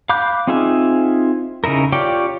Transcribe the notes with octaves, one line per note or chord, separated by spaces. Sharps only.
F5 B5 D6 F#6 G6
C4 D#4 F4 G#4 E5
C#3 D#4 E4 A#4
F4 G4 C#5 D5 G5